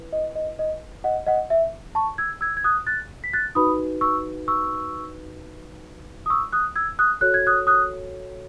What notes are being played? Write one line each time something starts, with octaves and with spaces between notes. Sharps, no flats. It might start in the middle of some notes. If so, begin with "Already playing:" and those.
Already playing: E4 B4
D#5
D#5
D#5
D#5 F#5
D#5 F#5
E5
A5 C#6
E6 G#6
E6 G#6
G#6
D#6 F#6
F#6 A6
B6
F#6 A6
D#4 F#4 B4 B5 D#6
C#6 E6
C#6 E6
D#6
C#6 E6
D#6 F#6
E6 G#6
D#6 F#6
F#4 A4 C#5 F#6
G#6
D#6 F#6
D#6 F#6